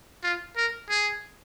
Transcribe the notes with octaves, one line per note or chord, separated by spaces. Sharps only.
F4
A#4
G#4